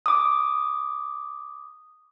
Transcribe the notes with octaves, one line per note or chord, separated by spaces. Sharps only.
D6 D#6